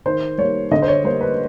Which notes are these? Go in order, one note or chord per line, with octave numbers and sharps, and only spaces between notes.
D#3 C5
G3 A#3 C#5
D3 D#5
C5
C#5
G3 A#3 C5
B4